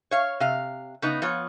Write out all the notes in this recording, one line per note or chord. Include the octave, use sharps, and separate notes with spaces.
C#5 F5
C3 F5
C#3 B3 D#4
F3 B3 F4 C#5